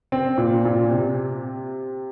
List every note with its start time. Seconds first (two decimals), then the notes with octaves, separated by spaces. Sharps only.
0.12 C4
0.38 A#2
0.65 A#2
0.90 C3